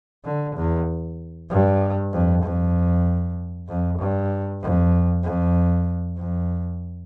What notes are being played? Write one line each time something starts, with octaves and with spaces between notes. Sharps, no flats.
D3
E2
G2
F2
F2
F2
G2
F2
F2
F2